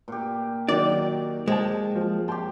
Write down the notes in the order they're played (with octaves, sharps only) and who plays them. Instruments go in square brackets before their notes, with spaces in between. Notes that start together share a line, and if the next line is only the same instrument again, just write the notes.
[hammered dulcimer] A#2 G4
[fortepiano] D#3 F#3 [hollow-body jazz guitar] D5
[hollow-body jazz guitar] G#3 [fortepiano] C5 G5 A5
[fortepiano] F3
[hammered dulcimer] G4 G5 [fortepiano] A5 C6